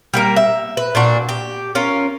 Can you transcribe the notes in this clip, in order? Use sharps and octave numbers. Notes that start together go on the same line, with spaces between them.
G3 A#3 A#4
E5
B4
A#2 D4 F#4
G4
C#4 F4 A#4